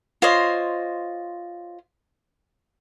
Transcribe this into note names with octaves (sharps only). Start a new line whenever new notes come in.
F4 C5 C#5 D#5